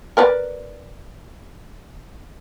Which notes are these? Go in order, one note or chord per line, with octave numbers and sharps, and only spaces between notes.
A#4 B4 D5